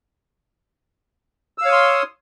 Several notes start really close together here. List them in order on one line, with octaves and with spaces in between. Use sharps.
E6 F5 C#5 D#6 C6